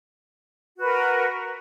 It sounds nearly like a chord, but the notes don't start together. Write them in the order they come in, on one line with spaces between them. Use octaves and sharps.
F#4 B4 A#4